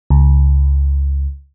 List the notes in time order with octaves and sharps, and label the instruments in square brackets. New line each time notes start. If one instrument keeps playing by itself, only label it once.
[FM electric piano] C#2